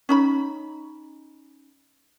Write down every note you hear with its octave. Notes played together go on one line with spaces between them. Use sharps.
C#4 D#4 B5